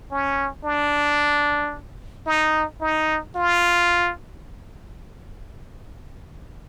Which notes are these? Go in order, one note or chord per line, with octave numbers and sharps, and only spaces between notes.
C#4
D4
D#4
D#4
F4